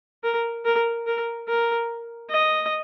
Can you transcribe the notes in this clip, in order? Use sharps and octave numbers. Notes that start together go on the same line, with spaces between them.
A#4
A#4
A#4
A#4
D#5